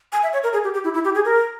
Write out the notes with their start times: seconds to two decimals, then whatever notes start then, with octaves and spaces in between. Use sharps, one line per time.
0.12 G#5
0.23 E5
0.33 C#5
0.43 A#4
0.53 G#4
0.64 G4
0.74 G4
0.84 E4
0.94 E4
1.05 G4
1.15 G#4
1.25 A#4